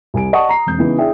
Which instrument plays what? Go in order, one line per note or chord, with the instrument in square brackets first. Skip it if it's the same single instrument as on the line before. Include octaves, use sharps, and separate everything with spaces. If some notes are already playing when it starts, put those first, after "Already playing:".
[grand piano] C2 G#5 D7
D5 D#5 F#5 A5 C#6 D#6
A#5 C7
E1 C4 G6
C#3 E3 B3 D#4
D4 E4 G#4 E5 G5